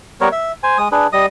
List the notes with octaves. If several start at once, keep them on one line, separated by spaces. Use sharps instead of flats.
G3 B3 A#4 C#5
E5
C5 G#5
G#3 D#6
D4 G#4 B4
G3 D#5 D#6